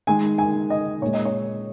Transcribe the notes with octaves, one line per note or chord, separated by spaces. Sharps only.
D#3 G#3 G#5
G#5
D#5
A#2 G#3 C#5
D#5
C#5